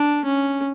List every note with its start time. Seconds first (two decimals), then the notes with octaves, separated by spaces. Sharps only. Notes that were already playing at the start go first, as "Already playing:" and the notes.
Already playing: D4
0.25 C#4